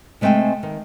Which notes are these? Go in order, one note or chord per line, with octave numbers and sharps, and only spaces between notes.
C3 G#3 A3 C4 G5 G#5
D#3